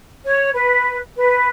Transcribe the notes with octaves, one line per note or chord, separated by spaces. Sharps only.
C#5
B4
B4